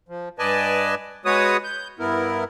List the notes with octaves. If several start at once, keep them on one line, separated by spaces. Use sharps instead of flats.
F3
G2 B4 D5 D#5 G#5 A5
G#3 B3 F#4 B4 C#5 D#6
G6
G2 B3 E4 A#4